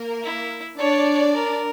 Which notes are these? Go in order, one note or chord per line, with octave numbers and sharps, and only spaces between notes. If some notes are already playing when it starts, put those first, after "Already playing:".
Already playing: A#3 A#4
E4
D4 C#5 D5
A#4